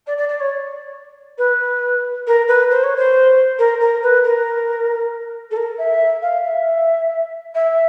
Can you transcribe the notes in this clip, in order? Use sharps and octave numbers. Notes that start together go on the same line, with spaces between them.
D5
D5
D5
C#5
B4
A#4
B4
C5
C#5
C5
A#4
A#4
B4
A#4
A4
A#4
E5
F5
E5
E5